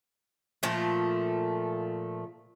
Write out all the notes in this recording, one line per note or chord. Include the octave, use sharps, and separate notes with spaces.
A#2 F3 A3